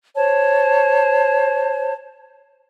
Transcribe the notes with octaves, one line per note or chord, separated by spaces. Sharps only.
C5 C#5 A5